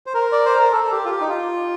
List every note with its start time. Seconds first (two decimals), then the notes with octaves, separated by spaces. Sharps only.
0.06 C5
0.14 A#4
0.32 D5
0.45 C5
0.59 A#4
0.72 A4
0.84 A4
0.91 G4
1.05 F4
1.11 G4
1.21 D#4
1.29 F4